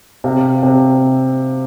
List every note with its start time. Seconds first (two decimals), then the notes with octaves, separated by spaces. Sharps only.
0.24 C3 F5
0.63 C3